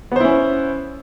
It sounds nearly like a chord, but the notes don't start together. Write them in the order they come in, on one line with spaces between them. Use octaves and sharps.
B3 C5 E4 C#4